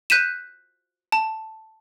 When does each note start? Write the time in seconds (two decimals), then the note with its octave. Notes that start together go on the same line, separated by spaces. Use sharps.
0.10 F#6 G6 B6 D#7 E7
1.12 A5